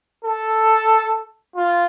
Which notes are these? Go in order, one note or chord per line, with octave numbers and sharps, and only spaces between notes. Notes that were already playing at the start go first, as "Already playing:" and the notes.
A4
F4